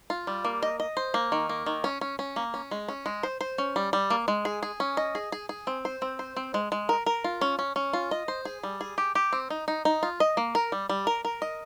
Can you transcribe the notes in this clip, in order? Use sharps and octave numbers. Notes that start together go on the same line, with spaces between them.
F4
G3
A#3
D#5
D#5
C5
A#3
D#3
A#3
D#3
C#4
C#4
C#4
A#3
C#4
G#3
C#4
G#3
C5
C5
C#4
G3
G3
A#3
G#3
G#4
G#4
C#4
D#5
G#4
G#4
G#4
C4
C5
C4
C5
C4
G#3
G#3
A#4
A#4
F4
C#4
C#4
C#4
F4
D#5
C5
G#4
G3
G#4
G4
G4
C4
D#4
D#4
D#4
F4
D#5
A#3
A#4
G3
G3
A#4
A#4
D#5